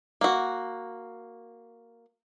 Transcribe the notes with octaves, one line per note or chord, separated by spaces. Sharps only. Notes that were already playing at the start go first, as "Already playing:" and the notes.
A#3 F#4